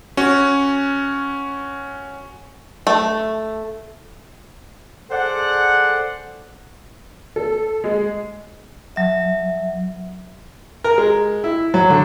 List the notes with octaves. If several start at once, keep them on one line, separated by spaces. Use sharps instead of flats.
C#4 F#4
A3
G#4 A4 C5 D5 F#5
A4
G#3
F#3 E5
A#4
G#3
E4
F#3
D3